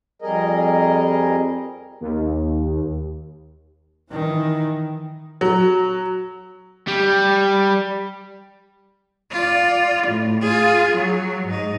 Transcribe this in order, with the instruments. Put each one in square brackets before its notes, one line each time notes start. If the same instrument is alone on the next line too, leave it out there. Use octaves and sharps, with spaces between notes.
[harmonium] F2 G3 G#4 A#4 D#5
[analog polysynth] D#2
[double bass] D#3 E3
[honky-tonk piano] F#3
[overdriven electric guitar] G3
[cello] F4 D5
A2
F4 G#4
F#3
G#2 D#4